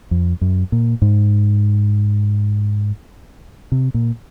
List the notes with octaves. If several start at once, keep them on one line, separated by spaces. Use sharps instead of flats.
F2
F#2
A#2
G#2
C3
A#2